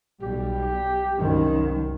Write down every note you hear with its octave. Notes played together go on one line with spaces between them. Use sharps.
B1 G3 G4
C2 F#2 D#3